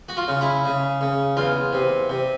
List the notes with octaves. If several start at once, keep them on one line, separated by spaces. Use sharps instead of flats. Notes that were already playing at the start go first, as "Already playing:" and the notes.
F#4
F4
C#3
E4
C#3
C#3
E2 F4
C3
C3